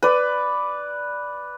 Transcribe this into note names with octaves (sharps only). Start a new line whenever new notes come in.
B4 D5